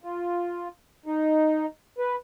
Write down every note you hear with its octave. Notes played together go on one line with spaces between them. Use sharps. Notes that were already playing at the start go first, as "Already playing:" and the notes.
F4
D#4
B4